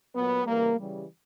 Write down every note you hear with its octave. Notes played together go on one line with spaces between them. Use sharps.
A#2 F#3 B3
C#3 E3 G3 A#3
C#3 E3 G3